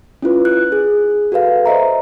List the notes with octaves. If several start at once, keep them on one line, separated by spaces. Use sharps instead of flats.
C#4 E4 F4 B4
F#6
G#4
F#4 A4 B4 F5
C5 D#5 E5 A#5